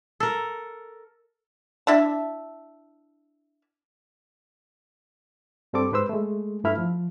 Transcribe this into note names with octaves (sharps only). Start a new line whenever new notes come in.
A4 A#4
D4 E4 E5 A5
G2 G3 C4 A4 D6
G#2 B4 C5 E6
G#3 A3
G2 A3 E4 E5 B5 F6
F3